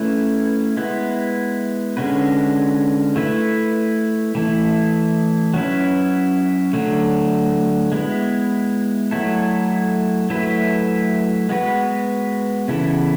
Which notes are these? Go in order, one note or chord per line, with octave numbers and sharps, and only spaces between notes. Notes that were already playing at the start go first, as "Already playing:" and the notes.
Already playing: A3 C#4 E4 B4
G#3 B3 E4 B4
D3 G#3 C#4 F#4 B4
A3 E4 B4
E3 A3 E4
F#3 C#4 E4 B4
D3 F#3 A3
G#3 B3 E4
F#3 A3 E4 A4
F#3 A3 E4 B4
G#3 B3 F#4 B4
C#3 E3 B3 E4 A4